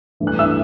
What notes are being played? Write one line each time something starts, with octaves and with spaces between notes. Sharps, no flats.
G2 E3 A3
F#6
E5 E6